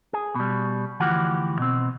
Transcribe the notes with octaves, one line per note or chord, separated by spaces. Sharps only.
G#4
B2 G3
D2 E3 F3 F#4 G4 F#5
B2 C4